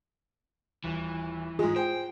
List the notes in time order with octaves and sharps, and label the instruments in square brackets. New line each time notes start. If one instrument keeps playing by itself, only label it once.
[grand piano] D#1 [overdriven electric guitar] E3
[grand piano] G#2 G#3 [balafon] F4 [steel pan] G#4
[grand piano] C5 [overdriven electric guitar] G5